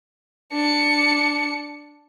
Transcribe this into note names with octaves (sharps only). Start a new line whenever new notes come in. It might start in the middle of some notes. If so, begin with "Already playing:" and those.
D4 C#7